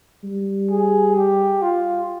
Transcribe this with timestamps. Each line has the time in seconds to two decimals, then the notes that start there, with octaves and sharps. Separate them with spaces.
0.24 G3
0.70 G#4
1.16 G4
1.62 F4